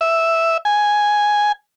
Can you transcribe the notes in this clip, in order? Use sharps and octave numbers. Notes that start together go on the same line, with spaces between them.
E5
G#5